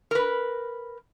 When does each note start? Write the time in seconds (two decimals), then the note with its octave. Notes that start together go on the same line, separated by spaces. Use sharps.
0.11 A#4 B4